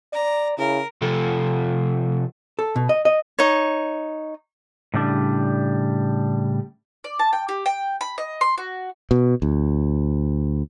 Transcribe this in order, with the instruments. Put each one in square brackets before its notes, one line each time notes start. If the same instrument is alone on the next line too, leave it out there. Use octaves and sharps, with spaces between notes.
[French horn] D5 [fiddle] A#5
[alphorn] C#3 [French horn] E4 [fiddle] A#4
[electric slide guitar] C3 F3 A4
[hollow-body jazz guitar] A4
B2
D#5
D#5
[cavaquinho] D#4 C#5
[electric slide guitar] A2 C#3 G3 D4
[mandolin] D5
A5
G5
G4
G5
B5
D#5
C6
F#4
[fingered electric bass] B2
D2